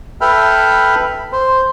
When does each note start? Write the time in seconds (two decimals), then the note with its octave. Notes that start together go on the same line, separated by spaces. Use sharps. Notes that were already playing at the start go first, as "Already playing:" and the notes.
0.21 A4 B4 E5 G5 B5 F6
1.32 C5